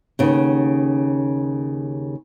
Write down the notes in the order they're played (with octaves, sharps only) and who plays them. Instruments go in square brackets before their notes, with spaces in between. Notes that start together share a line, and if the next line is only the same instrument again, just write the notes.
[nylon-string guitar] D#2 C#3 B3